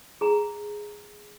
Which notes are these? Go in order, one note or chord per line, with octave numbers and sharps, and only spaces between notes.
G#4 A#5